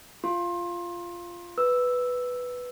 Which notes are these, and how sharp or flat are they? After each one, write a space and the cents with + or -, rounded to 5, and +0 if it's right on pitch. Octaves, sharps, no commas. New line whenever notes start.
F4 -10 C6 +25
B4 +0 E6 +0